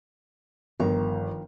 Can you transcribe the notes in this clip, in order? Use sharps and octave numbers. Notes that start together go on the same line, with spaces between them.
G1 D#3 F3 A#5